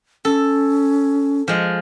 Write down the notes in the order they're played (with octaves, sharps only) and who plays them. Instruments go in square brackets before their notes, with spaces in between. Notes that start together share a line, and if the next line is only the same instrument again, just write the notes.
[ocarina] C#4 [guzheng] A4
[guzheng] F3 G#3